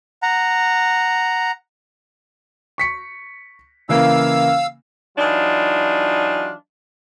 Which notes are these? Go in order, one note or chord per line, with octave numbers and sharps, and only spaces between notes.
F#5 A#5
C#6 B6 C#7
C#3 E3 A#3 F5 E6
E3 F#3 D4 D#4 F4